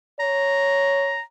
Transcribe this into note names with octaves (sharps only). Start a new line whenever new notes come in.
C#5 A#5